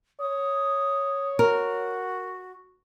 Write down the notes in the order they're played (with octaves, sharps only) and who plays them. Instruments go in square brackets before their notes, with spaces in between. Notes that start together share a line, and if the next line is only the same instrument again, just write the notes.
[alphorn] C#5 [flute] D#6
[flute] F#4 [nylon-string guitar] A#4